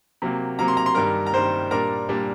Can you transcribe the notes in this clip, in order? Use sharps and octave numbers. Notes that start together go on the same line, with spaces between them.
C3 F#3 A#3
C3 F#3 A#3 A#5
C6
A#5
C6
G2 D#3 G3 A#4 A#5
A#5
G2 D#3 G3 C5 C6
A#2 G3 D4 A#4 A#5
A#2 G3 D4